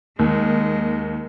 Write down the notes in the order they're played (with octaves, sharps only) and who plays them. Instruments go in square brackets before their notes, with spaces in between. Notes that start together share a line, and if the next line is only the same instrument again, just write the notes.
[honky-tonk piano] D#2 [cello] G#3